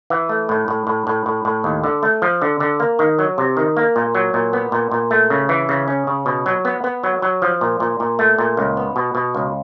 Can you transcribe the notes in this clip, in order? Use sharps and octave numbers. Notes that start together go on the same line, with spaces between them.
E3
A3
A2
A2
A2
A2
A2
A2
D#2
D3
A3
F3
D3
D3
A#3
D#3
F#3
C3
D#3
A#3
A#2
F#3
A#2
B3
A#2
A#2
A3
C#3
E3
C#3
C#4
C#3
B2
F#3
B3
B3
F#3
F#3
F3
A#2
A#2
A#2
A3
A#2
C#2
B3
B2
B2
C#2